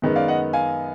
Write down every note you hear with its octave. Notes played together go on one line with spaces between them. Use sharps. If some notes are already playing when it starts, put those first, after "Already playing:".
F#2 D#3 G#3 B3
D5 F5
D#5 F#5
F5 G#5